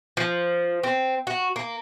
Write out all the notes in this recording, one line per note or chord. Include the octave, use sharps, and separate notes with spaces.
F3
C4
F#4
A#3